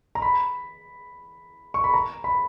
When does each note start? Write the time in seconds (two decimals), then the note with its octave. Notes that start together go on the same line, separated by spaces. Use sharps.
0.15 A#5
0.22 B5
1.74 C#6
1.84 B5
1.94 A#5
2.24 B5